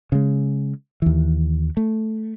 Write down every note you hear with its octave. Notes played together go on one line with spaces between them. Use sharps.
C#3 G#3
D#2 E3
A3